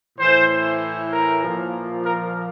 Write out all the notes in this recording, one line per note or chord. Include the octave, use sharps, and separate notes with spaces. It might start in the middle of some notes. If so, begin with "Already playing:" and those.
A2 E3 C5
A#4
A#2 F3
A#4